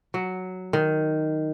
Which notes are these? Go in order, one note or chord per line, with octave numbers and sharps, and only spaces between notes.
F#3
D#3